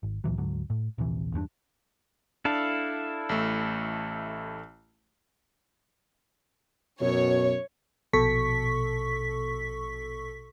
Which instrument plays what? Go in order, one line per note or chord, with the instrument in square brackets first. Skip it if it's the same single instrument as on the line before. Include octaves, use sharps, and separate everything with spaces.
[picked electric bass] G#1
D2 A#2 E3 F#3
D2 G#2 D3 F#3
A2
D#1 A#1 C3 E3
E2 G2 B3 D4
[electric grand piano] D4 [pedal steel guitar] E4 A4 F5
[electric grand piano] A1 A3
[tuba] F#2 [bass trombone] B2 [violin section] C#5
[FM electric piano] A#1 B2 A4 C#6 B6